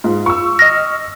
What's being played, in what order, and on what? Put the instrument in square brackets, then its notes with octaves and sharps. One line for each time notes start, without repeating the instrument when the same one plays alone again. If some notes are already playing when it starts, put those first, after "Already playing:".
[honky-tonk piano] G#2 [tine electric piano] F4
[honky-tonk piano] C#6 E6
[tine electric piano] D#5 F6 [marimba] A#6